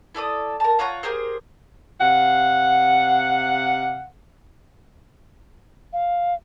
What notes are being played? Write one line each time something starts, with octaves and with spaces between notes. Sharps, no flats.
E4 A4 D5 D#6
A#4 A5
F4 C#5 F#5 A#5
G4 G#4 A#4 C5
C3 F5 F#5
F5